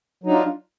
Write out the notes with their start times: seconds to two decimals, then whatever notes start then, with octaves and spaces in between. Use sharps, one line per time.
0.23 F#3
0.26 D#4
0.29 D4
0.32 F4